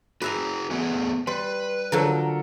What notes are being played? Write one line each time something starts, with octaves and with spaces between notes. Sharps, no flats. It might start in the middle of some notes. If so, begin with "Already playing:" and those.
F#4 G#4 B4 E5 A#5
A3 B3 G#4
G3 B4 C6
D3 F3 F#3 A4 A#4